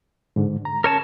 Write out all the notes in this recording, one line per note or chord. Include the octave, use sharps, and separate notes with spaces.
G#2 D3
A#5
C#4 A#4 C#5 A5